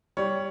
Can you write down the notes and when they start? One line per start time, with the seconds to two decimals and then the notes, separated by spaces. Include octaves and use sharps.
0.17 G3 C#5